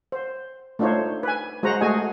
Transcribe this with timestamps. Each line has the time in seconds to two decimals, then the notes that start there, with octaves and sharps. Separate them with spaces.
0.12 C5
0.79 A3 D4 D#4 F4 C5 C#5
1.23 B4 G#5
1.63 G#3 F#4 C5 F#5 A#5
1.81 A3 F#4 G#4 D#5 G#5